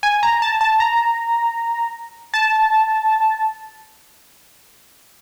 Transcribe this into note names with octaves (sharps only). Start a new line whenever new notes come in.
G#5
A#5
A5
A5
A#5
A5